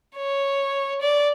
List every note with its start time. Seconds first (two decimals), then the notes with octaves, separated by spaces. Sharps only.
0.16 C#5
1.01 D5